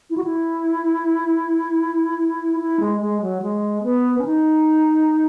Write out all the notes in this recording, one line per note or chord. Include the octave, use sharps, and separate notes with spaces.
E4
F#4
E4
E4
G#3
G#3
F#3
G#3
B3
C#4
D#4